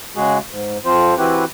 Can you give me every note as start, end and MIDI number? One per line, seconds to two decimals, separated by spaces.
0.16 0.38 49
0.16 0.38 56
0.16 0.38 66
0.16 0.38 68
0.50 0.78 44
0.85 1.14 41
0.85 1.14 53
0.85 1.14 60
0.85 1.14 65
0.85 1.14 72
1.18 1.44 52
1.18 1.44 60
1.18 1.44 64
1.18 1.44 66
1.18 1.44 67
1.18 1.44 71